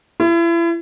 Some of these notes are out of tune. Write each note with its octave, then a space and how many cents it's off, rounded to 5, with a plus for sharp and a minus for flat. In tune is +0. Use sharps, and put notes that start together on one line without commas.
E4 +35